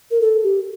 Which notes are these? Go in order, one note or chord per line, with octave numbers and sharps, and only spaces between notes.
A#4
A4
G4